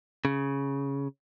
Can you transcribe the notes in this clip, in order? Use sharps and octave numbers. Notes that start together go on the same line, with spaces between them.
C#3